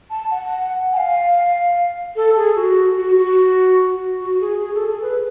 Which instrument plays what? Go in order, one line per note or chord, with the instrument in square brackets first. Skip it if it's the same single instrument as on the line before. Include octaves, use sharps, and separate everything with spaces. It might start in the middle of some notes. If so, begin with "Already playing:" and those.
[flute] A5
F#5
G#5
F5
A4
G#4
F#4
F#4
F#4
F#4
G#4
G#4
A4
G#4
B4